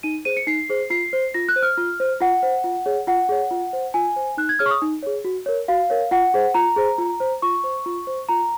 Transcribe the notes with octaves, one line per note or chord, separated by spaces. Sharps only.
D#4 D#7
G#4 C5 D#7
C#7
D#4 C7
G#4 C5
F4 C7
C5
F4 A#6
F#6
C5
F6
F4
C5
F4 F#5
C5
F4
G#4 C#5
F4 F#5
G#4 C#5
F4
C5
F4 G#5
C5
D#4 F#6
G#6
G#4 C#5 F6
C#6
D#6
D#4
G#4 C#5
F#4
A#4 C#5
F#4 F5
A#4 C#5
F4 F#5
G#4 C5
F4 A#5
G#4 C5
F4
C5
F4 C#6
C5
F4
C5
F4 A#5